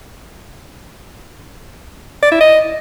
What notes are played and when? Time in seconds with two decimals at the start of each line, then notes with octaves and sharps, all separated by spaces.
2.23 D5
2.32 E4
2.40 D#5